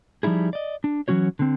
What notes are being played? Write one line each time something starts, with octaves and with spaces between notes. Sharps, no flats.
F3 G3 D#4 E4 G#4
D5 D#5
D4
E3 F#3 C#4 F#4 C#5
D3 C4